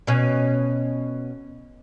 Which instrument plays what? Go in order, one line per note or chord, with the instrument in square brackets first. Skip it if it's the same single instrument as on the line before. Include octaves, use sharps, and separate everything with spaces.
[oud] B2 C#4